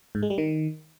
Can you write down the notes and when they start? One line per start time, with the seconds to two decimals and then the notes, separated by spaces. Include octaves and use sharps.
0.15 G#2
0.23 G#3
0.30 G3
0.38 D#3